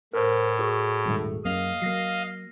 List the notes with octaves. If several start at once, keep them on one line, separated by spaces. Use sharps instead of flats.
A2 A#4 C5
F#4 G#4
D#1 G#2 A3
F#2 A#3 C#4 D#5 F5
F#3 A#3 F6 A#6 C7